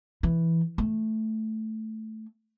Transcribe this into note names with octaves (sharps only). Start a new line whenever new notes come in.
E3
A3